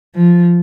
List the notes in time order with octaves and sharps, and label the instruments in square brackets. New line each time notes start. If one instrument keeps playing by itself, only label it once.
[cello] F3